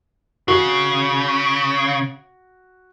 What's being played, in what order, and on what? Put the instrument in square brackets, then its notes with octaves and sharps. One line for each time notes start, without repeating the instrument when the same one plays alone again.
[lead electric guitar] C#3 [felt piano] F#4